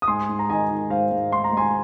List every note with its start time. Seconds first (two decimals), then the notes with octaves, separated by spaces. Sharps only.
0.02 D#6
0.07 G#2 G#5 C6
0.29 G#2
0.39 A#5
0.49 D#3 D#5 G#5
0.70 D#3
0.90 G#2 C5 F5
1.12 G#2
1.32 G#2 C6
1.44 A#5
1.52 G#3 G#5 C6